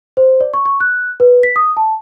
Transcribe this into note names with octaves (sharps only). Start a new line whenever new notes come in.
C5
D5
C#6
C#6
F#6
B4
B6
D#6
A5